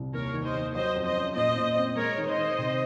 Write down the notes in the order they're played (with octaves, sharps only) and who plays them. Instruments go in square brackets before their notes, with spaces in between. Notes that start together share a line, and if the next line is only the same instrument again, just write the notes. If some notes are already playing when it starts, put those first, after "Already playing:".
Already playing: [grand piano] C2
[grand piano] D#2 [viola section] A#4 C#5
[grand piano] D#3
[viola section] C5 D#5
[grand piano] D#2
[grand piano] F#3 [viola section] C5 D#5
[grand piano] F2
[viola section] C5 D#5
[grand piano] C#4
[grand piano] A#2 [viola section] C5 D#5
[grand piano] A#2
C4
[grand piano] G#3 [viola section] A#4 C#5
[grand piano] D#3
[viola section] C5 D#5
[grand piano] D#3
C3